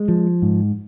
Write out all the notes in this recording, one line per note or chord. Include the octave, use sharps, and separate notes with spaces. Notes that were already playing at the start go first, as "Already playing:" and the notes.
Already playing: G#3
F3
G#2